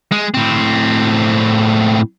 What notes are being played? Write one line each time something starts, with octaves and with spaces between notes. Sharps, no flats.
G#3
A2 C4